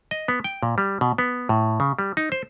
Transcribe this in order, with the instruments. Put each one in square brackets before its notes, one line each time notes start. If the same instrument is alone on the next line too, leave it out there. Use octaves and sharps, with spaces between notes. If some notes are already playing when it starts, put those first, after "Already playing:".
[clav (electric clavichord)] D#5
B3
G5
A#2
G3
B2
B3
A2
C#3
G3
D#4
C5